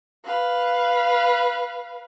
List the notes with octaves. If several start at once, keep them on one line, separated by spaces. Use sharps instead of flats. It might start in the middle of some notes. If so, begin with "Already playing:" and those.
B4 F5